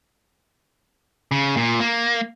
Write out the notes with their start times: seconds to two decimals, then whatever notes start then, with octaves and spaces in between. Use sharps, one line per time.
1.32 C#3
1.57 A#2
1.80 A#3